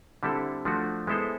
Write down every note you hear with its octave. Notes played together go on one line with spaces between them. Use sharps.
D3 G3 C4 E4 A4
F3 A3 D4 F#4
G#3 B3 E4 A4 C5